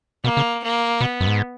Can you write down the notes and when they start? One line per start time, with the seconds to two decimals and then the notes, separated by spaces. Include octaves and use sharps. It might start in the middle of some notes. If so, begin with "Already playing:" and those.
0.24 B2 A#3
0.37 C#3
0.63 A#3
1.01 B2 B3
1.20 F#2
1.27 G#2